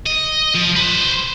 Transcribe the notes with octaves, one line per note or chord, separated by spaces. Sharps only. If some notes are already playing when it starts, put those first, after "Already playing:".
D#5
F3
B4 C5